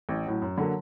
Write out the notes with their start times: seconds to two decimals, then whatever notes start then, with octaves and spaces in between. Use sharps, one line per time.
0.09 A1
0.26 A2 F#3
0.42 F#2
0.58 D3 F#3 A#3